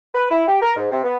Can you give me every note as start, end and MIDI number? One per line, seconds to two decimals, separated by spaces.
0.15 0.27 71
0.31 0.44 64
0.48 0.58 67
0.62 0.72 70
0.76 0.88 44
0.91 1.01 48
1.04 1.17 59